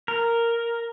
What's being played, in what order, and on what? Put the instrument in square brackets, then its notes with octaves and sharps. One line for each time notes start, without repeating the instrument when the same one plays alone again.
[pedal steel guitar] A#4